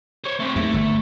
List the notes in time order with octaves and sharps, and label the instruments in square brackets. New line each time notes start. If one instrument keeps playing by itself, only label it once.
[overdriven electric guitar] C5 C#5
A3 C4
[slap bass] D#2 [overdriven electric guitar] A3
[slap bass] G1